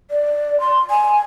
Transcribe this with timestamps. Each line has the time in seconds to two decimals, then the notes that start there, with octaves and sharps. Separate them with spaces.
0.11 D5
0.60 C6
0.91 G#5